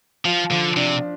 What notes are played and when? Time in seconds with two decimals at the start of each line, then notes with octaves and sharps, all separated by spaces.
0.25 F3 F4
0.51 D3 F3
0.76 C3 D4